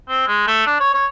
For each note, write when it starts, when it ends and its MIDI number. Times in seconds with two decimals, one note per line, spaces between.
0.09 0.24 60
0.27 0.46 56
0.48 0.66 57
0.67 0.77 62
0.80 0.90 73
0.94 1.06 73